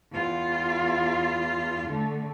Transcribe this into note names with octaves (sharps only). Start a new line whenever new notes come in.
E2 F4
D3 A3